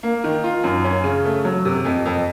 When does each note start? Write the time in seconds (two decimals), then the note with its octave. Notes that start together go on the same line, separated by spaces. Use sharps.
0.03 A#3
0.24 D#3
0.44 F4
0.64 F#2
0.84 C#4
1.04 C#3
1.25 A3
1.45 F#3
1.65 C3
1.85 F2
2.05 F2